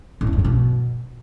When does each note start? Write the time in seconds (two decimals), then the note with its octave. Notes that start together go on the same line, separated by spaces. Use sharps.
0.21 A2
0.27 C#3
0.33 G2
0.39 E2
0.45 B2